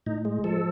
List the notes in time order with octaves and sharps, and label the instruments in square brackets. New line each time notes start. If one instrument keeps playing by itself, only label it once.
[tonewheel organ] A2 D#4
G#3
F3 A4